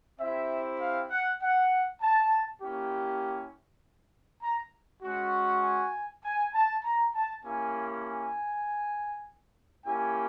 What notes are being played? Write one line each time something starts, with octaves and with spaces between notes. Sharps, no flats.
C4 E4 G4 E5
F5
F#5
F#5
A5
A#3 C#4 E4 G4
A#5
G#3 C#4 F#4
G#5
G#5
A5
A#5
A5
A#3 C#4 E4 G4 G#5
G#5
A#3 C#4 E4 G4 G#5